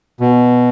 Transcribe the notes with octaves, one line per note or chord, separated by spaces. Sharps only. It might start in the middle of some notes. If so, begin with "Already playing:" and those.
B2